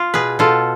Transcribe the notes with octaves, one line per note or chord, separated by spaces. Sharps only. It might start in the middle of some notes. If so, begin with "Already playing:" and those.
Already playing: F4
B2 G#4 B4
B2 F4 A4